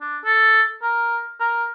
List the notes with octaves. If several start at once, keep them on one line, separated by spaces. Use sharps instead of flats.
D4
A4
A#4
A#4